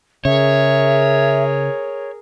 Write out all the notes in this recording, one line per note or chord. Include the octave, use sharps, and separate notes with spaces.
C#3 G#4 A#4 C#5 E5